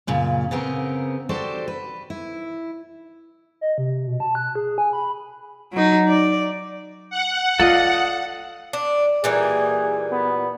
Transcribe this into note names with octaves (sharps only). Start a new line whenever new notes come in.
F#2 A#2 C#3
C#3 B3 C4 A#4
F#4 G4 A4 C5 D5
B4
E4
D#5
C3
B2
A5
F#6
G#4
G#5
B5
F#3 D#4
D5
F#5
F4 A4 D5 D#5 F5
D4
A#2 E3 G3 G#4
B3